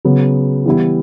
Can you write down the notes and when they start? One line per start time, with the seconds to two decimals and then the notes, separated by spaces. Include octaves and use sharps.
0.05 C#3 F#3 B3
0.66 E3 G3 B3 E4